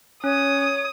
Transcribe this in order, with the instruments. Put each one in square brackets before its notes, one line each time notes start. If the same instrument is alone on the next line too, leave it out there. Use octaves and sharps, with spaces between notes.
[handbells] C#4 [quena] C#5 [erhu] D#6